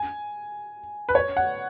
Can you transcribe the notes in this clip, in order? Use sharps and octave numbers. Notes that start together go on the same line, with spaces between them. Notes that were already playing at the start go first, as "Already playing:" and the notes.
Already playing: G#5
B4
C#5
F#5